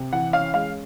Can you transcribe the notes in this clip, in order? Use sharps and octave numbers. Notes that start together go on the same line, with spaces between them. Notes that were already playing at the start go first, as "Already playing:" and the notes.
Already playing: C3
E3 F#5
C#4 F5
G#3 F5